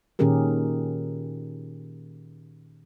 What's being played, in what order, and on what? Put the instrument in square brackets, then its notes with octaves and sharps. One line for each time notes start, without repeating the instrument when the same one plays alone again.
[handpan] A#2 D#3 C#4 G4 G#4 A#4